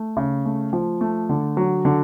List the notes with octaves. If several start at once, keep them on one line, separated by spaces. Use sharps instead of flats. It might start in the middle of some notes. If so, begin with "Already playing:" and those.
Already playing: A3
C#3
A3
F3
A3
D3
F#3
D3